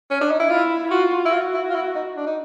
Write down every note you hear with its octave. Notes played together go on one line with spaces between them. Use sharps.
C#4
D4
D#4
E4
E4 F4
F4 F#4
E4
F4 F#4
E4
F4
E4
D#4
D4
D#4